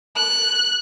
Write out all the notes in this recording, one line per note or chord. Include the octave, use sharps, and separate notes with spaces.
F#6